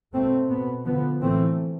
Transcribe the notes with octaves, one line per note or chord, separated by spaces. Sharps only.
B2 A3 C4
B2 B3
D3 F3 B3
A2 E3 A3 C4